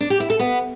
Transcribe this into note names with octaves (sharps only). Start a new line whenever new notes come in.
D4
G4
E4
A4
B3